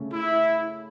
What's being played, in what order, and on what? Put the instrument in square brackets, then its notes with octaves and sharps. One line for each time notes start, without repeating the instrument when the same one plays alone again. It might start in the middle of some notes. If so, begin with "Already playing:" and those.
Already playing: [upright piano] C#3 A3 C#4
[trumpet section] E4